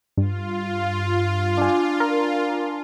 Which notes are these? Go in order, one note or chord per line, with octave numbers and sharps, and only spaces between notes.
G2 F4
D4 G#5
A#4